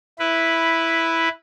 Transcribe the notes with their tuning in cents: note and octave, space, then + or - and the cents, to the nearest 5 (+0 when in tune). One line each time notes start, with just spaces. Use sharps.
E4 +0 B4 +0